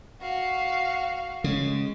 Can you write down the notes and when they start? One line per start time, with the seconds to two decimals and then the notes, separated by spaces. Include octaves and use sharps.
0.21 F#4 F5
1.44 C#3 G#3